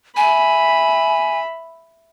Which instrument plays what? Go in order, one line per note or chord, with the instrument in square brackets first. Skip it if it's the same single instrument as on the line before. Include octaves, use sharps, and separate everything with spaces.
[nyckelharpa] E5 B5 [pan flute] G#5